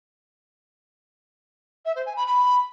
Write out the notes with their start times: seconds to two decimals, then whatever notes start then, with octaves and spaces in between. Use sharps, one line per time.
1.85 E5
1.96 C5
2.06 G#5
2.16 B5
2.27 B5